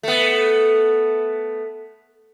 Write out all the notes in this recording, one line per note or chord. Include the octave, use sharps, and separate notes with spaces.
A3 B3